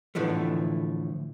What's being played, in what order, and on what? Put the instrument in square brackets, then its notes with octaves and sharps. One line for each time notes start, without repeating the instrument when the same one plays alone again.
[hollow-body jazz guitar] A2 D3 E3 F3 A3